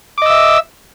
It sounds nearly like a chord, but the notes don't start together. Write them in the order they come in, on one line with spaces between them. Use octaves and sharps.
D6 D#5 E6 E5